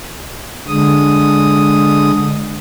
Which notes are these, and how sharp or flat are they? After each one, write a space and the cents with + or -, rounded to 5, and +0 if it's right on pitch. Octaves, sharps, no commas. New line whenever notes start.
D3 +0 G#3 +0 D#6 +0